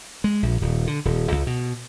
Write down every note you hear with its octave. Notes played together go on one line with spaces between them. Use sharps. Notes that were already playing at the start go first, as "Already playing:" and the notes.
G#3
A#1
D#1
D3
D#1
C#2
B2